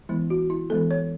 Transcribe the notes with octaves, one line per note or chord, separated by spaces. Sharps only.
E3 G#3 B3 E4
F#4
E4
E3 G#3 B3 A4
C#5